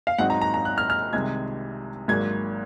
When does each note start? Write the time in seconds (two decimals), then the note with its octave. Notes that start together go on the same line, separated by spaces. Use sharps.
0.07 F5
0.18 G#1 G#2 F#3 C4 D#4 F#5
0.30 A#5
0.41 A#5
0.54 A#5
0.65 F#6
0.78 F6
0.90 F6
1.13 C2 C3 D#3 G#3 G#6
2.08 G#1 G#2 F#3 A#3 G#6